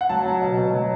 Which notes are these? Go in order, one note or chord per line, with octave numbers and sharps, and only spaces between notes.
F#5
F#3 A5
F#3
B2
B2
F#3